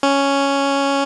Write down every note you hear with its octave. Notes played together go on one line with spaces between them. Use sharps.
C#4